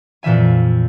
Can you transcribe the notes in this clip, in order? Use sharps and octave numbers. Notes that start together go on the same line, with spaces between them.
F2 A#2 E3 E5 G#5